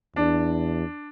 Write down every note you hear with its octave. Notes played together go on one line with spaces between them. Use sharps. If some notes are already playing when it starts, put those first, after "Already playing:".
E2 D4